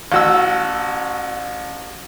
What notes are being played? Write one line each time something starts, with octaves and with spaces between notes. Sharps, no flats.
A1 F#4 E6